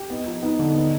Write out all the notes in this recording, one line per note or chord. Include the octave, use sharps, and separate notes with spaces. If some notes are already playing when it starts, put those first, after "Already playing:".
Already playing: G4
B3 D#4
F3
B3 D#4
D3
B3